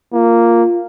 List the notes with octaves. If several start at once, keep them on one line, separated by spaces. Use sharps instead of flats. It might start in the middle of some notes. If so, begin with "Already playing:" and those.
A#3 F4